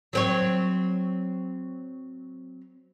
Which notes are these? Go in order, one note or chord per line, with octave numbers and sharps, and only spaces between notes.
F#3 C4 C#5